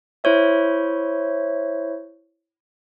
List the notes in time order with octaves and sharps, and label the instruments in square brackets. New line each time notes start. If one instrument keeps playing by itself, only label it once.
[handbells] E4 C5 C#5 E5